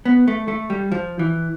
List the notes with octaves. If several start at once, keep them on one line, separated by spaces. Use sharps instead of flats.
B3
A3
A3
G3
F3
E3